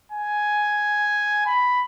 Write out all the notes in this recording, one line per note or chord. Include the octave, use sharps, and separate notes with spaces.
G#5
B5